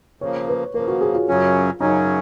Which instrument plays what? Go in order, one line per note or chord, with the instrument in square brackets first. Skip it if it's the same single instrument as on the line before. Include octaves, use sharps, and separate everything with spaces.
[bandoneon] C#3 F3 A#3 [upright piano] C#5
[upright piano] B4
[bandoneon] C#3 F3 A#3 [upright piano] A#4
[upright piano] F#4
G#4
F4
[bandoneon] F#2 C#3 F#3 C#4
[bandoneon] F#2 C#3 F#3 C#4 [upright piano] D#4